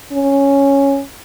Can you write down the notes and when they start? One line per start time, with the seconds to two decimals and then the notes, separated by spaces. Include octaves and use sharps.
0.12 C#4